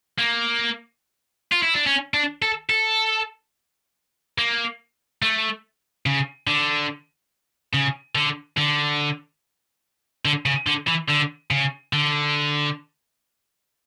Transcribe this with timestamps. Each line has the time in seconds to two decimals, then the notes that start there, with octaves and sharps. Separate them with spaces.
0.19 A#3
1.52 F4
1.63 E4
1.74 D4
1.87 C#4
2.14 D4
2.42 A4
2.70 A4
4.38 A#3
5.22 A3
6.06 C#3
6.47 D3
7.73 C#3
8.15 D3
8.57 D3
10.25 D3
10.46 C#3
10.67 D3
10.88 E3
11.09 D3
11.51 C#3
11.93 D3